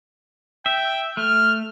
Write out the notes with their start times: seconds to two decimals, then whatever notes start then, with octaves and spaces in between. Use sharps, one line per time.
0.66 E5 G5
1.17 A3 F6